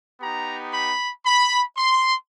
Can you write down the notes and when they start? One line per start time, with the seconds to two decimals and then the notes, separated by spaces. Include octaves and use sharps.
0.20 B3 D#4 G4 A#5
0.73 B5
1.25 B5
1.76 C6